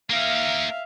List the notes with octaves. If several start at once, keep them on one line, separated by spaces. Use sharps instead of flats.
A#3 D#4 E5 F5